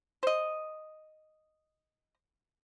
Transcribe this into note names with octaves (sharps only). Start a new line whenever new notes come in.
C5 D#5